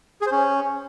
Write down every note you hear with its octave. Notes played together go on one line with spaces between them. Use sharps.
G#4
C5
C#4